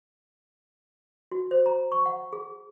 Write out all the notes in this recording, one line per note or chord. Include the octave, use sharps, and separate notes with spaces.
F#4
C5
A#5
C#6
F#5
G#4